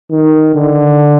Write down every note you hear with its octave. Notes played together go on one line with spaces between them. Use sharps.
D#3
D3